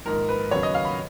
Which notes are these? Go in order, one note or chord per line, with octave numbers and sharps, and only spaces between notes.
A#1 G#2 D#3 A#3 A#4
B4
D#2 C#3 F#3 B3 C#5
D#5
F5
B5